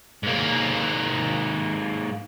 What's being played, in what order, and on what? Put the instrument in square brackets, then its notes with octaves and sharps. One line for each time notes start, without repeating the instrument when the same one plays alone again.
[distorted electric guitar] G#2 A#3